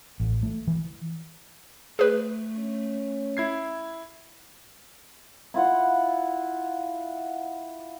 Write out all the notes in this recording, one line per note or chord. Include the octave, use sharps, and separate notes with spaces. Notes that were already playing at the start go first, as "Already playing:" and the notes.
A1
A3
E3
A3 G#4 B4
C#4
E4 G#6 C7
E4 F4 F#5